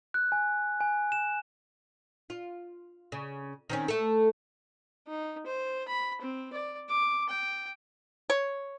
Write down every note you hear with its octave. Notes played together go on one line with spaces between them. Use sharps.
F#6
G#5
G#5
E7
F4
C#3
D#3 C4 C#4
A3 A4
D#4
C5
B5
C4
D5
D6
G5
C#5